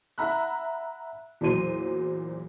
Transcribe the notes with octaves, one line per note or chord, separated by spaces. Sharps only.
E5 F#5 A#5 B5 E6 F#6
E2 A#2 F#3 C5 D#7